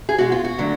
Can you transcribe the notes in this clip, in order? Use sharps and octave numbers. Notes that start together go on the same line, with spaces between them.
G#4
B2 G#3 F#4
F4
F#4
D3 F#3 A3